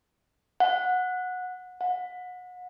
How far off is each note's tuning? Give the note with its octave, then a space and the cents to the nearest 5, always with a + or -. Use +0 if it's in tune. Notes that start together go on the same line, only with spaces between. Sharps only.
F#5 -15
F#5 -30